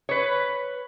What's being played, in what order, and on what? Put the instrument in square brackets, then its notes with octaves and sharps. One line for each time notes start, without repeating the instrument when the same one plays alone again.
[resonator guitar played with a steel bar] B4 C#5